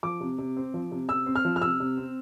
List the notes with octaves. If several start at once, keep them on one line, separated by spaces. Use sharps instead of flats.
F3 D6
C3
C3
C4
F3
C3
C3 E6
C4
F6
F3
F6
C3 E6
C3
C4